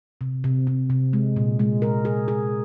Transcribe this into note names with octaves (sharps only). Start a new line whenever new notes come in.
C3
C3
C3
C3
G#3
A#2
G#3
A#4
G#4
G#4